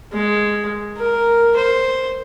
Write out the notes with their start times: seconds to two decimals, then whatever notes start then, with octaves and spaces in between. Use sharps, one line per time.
0.13 G#3
0.97 A#4
1.57 C5